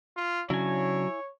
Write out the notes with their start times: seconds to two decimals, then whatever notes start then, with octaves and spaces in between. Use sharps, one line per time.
0.17 F4
0.50 C#3 F#3 D4 E4 C#5 G#5